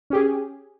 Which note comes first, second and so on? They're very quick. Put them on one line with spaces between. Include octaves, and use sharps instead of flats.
C#4 G4 G#4